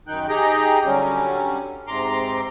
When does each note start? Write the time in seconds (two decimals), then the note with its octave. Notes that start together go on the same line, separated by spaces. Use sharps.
0.07 F#2 D#3 D#4 G5 F#6
0.29 D#4 G4 G#4 D#5 G5 A#5
0.85 D3 F#3 G3 C#4
1.87 G#2 C3 A#5 C6 D6